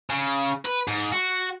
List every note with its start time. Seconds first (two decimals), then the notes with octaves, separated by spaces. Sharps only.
0.10 C#3
0.65 B4
0.88 G#2
1.12 F#4